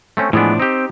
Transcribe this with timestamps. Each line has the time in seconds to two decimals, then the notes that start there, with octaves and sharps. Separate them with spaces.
0.17 A3 C4 C#4
0.33 A2 E3 F3 G#3 B3 D4
0.60 C4 D#4 G4